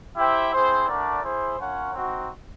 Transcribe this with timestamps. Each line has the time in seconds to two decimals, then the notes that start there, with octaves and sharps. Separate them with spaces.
0.17 E4 G4 C5 E5 G5
0.53 C4 E4 G#4 C5
0.88 A3 D4 F#4 A#4 D5
1.23 E4 G#4 C5
1.59 C#4 F4 A#4 C#5 F#5
1.94 C4 D#4 F#4